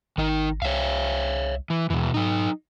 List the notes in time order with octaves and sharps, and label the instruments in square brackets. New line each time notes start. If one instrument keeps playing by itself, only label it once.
[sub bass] G#1 [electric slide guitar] D#3 D#4
[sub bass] C2 [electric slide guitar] C#5 E5 F5
[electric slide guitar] E3
[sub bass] D#2 [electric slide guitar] B2 E3
[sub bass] G#2 [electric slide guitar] F#3 D#4